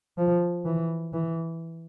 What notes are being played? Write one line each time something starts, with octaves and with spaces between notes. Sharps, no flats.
F3
E3
E3